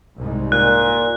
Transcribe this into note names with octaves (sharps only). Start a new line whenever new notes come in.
C2 G#2
A#2 F#6